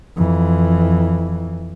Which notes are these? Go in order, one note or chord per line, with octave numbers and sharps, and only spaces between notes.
F2 E3